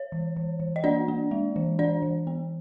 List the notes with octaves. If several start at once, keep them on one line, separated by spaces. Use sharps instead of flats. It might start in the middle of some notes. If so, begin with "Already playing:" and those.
Already playing: C#5
E3
E3
E3
D#5
A#3 D4 D5
A#3
G#3
E3
E3 D4 D5
E3
B3